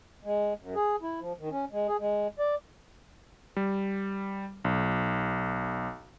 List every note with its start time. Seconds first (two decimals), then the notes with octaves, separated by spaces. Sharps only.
0.24 G#3
0.60 F#2
0.75 G#4
1.02 E4
1.20 F3
1.39 D#3
1.51 C#4
1.72 G#3
1.88 G#4
2.00 G#3
2.39 D5
3.57 G3
4.64 B1